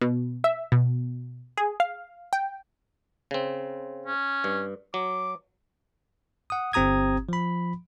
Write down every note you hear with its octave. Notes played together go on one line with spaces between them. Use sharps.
B2
E5
B2
G#4
F5
G5
C#3 C4
C#4
G2
F#3 D6
F#5 D#6
G1 C4 G4 A#5 D#6 G#6
F3 B5